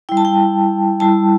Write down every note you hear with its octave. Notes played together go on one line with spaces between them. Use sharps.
G3 E4 G5
A5
G5
G3 E4 A5